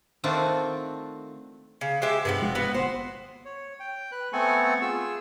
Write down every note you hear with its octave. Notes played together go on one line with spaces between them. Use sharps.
D#3 A3 C4 D4 F4 F#4
C#3
G#3 G4 E5
G2 C3 F3 B3
E1
B3 F#4
G1 C5
C#5
G5
B4 F#6
A3 B3 C4 A4 G#5 C#6
F4 G#4 E6